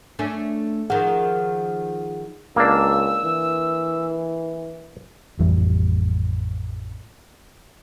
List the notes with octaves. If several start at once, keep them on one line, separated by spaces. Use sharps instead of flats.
A3 C#4 D4
D#3 F3 G#4 F#5
C#2 A#3 D4 E6
E3
A1 F2 E3 G3